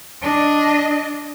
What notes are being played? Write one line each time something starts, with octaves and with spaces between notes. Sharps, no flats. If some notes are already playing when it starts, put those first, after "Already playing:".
D4 D#5